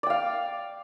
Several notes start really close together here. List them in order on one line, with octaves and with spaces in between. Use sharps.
D5 G5 F5